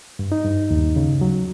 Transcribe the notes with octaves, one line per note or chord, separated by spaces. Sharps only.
G2
D#4
G2
D#2
C#3
F#3